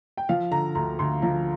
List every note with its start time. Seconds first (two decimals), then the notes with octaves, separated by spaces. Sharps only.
0.17 G5
0.29 F3 F5
0.51 D3 A#5
0.75 D2 A#5
0.99 D2 C6
1.22 F3 A#5